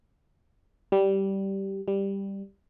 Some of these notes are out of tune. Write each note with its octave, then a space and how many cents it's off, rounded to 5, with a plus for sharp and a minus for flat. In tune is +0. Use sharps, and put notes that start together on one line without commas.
G3 -10
G3 +5